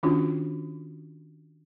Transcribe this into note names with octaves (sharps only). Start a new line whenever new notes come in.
D#3 C#4 D4 F4 F#4